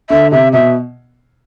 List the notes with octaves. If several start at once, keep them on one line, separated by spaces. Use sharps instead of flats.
D3 E5
C3 E5
B2 E5